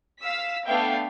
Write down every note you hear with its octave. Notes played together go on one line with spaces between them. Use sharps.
F5 E6 B6
A3 B3 D4 E5 F5 G5